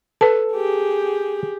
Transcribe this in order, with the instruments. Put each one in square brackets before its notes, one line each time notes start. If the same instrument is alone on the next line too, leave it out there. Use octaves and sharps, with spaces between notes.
[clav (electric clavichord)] A4 [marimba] B4 A5
[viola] G4 G#4